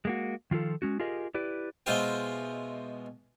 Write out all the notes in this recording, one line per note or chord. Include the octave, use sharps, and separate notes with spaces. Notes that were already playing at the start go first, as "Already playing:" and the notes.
G#3 A#3 F#4
D#3 F3 F4 A4
G#3 C#4 F#4
F4 G4 G#4 A#4 D#5
E4 G4 B4 D5
B2 G#3 E4 F4 C5 G5